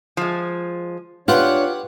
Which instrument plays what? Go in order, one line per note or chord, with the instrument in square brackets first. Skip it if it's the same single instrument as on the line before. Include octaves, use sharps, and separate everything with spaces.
[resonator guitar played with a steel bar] F3 G#3
[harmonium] D4 C#5 [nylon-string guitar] F4 [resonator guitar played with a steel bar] G4 [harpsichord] B4 F#5